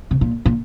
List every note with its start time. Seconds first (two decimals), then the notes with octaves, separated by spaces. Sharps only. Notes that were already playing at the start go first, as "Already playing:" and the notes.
0.11 C3
0.21 A#2
0.46 A#2